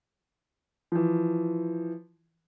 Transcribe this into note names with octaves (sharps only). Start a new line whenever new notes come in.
E3 F3